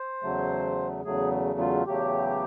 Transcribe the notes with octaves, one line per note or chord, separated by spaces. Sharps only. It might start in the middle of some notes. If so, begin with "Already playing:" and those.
Already playing: C5
E2 C#3 F#3 A3
E2 C#3 F#3 A3 G#4
F4
E2 C#3 F#3 A3 G4